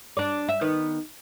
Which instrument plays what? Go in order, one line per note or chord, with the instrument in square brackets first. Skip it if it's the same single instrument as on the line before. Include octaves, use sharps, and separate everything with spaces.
[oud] D4 D5
E5
D#3 B3